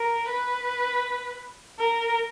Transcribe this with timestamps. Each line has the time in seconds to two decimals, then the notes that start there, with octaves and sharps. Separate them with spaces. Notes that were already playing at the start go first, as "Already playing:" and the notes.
Already playing: A#4
0.30 B4
1.79 A#4